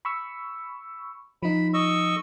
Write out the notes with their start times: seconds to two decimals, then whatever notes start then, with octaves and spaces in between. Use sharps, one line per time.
0.05 B5 C#6 E6
1.43 F3 D#4 B5
1.74 D#5 C#6 E6